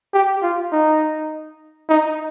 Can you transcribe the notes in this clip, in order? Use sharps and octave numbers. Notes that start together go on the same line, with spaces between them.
G4
F4
D#4
D#4